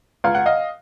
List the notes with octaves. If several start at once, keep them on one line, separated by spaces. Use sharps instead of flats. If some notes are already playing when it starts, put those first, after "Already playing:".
C#2 F5
F#5
D#5 F5